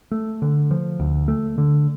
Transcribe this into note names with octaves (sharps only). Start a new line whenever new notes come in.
A3
D3
F3
D2
A3
D3